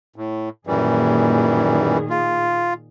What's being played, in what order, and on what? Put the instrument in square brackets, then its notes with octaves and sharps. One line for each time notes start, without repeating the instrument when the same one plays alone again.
[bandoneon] A2
[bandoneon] F#2 E3 G3 [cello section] A#2 D#3 G#4
[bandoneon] F4